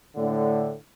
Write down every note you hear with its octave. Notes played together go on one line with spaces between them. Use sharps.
A2 D3